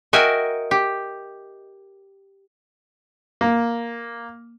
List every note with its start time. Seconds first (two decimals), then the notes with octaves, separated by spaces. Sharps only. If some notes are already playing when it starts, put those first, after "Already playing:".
0.13 F#4 A#4 D#5 E5 G5 G#5
0.71 G4
3.41 A#3